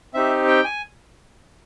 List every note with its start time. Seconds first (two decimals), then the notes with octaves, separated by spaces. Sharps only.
0.14 C4 D#4 G4 E5
0.48 G5
0.64 G#5